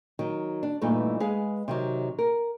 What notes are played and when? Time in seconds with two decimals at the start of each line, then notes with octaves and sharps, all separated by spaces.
0.19 D#3 F#3
0.63 D4
0.81 G2 A#2 E3 A3 D#4
1.20 G#3 G#4 B4 F5
1.68 C3 D#3 F#3
2.19 A#4